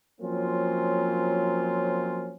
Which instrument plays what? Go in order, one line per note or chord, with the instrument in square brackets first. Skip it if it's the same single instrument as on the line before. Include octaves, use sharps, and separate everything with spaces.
[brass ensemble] F3 F#3 A#3 C4 C#4 F4